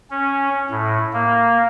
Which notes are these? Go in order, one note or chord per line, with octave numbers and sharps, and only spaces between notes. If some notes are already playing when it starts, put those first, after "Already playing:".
C#4
A2
A#3